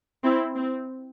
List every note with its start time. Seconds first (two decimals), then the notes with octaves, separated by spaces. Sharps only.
0.23 C4 E4
0.55 C4